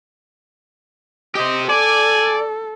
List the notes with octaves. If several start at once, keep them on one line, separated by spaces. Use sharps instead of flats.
G4 C5 D#5
A4 D5 G#5